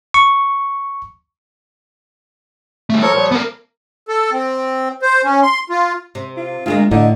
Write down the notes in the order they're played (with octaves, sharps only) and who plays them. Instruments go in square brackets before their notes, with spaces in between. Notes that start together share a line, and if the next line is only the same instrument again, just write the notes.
[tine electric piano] C#6
[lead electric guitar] G3 A3
[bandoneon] F3 A4 A#4 [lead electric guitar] C#5
[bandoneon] A#2 F3 G3
[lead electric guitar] B3 A#4
[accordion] A4
C4
C5
C#4
C6
F4
[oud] C3
[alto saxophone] F4
[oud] D2 G#3 A#3 [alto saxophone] F4
[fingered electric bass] A2 [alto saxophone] D3 [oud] D#4